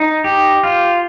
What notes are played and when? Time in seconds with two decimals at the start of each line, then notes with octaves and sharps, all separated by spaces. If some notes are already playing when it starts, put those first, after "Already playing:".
Already playing: D#4
0.24 G4
0.63 F4